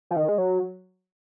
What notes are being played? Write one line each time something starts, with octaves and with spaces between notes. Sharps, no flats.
F3
D#3
G#3
F#3